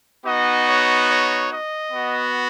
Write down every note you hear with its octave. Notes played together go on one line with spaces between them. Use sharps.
B3 D#4 F#4 D#5
C#5
C#5
D#5
B3 F#4